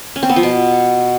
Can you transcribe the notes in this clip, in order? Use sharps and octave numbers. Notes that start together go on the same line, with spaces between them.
C#4
C4
B3
F3
B2